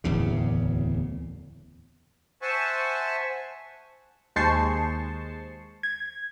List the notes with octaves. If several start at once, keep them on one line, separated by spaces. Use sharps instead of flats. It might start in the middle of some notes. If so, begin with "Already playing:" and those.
D1 E2 C#3
C5 E5 F#5 G#5 A5 C#6
D#2 G#3 C5 A5 C#6 C7
G#6